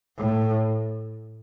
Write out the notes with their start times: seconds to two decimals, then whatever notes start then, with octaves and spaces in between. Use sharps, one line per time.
0.18 A2